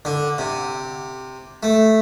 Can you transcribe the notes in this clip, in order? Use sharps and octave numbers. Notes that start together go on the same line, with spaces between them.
D3
C3
A3